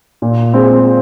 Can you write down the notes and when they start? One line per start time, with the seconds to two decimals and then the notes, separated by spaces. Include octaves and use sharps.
0.22 A#2
0.54 G#3 C4